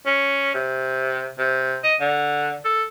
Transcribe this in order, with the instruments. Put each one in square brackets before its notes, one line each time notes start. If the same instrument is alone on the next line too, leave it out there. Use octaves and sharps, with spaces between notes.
[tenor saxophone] C#4
C3
C3
D#5
D3
A4